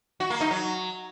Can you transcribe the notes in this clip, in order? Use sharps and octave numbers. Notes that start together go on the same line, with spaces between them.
F#4
A#3
D#4
F#3